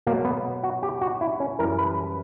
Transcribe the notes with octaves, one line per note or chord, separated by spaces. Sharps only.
B2 F#3 A#3
B3
F#4
G4
F#4
E4
C#4
F#2 E3 G3 A#4
B4
B4